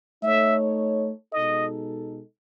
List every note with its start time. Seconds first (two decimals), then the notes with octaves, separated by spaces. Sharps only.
0.23 A3 D#4 A4 C#5 E5
1.32 B2 G#3 D#4 A4 D#5